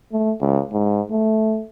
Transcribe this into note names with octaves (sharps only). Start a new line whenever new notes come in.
A3
C#2
G#2
A3